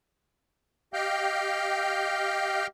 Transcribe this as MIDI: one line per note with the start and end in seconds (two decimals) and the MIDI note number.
0.93 2.67 67
0.93 2.67 75
0.93 2.67 77
0.93 2.67 79
0.93 2.67 89
0.93 2.67 91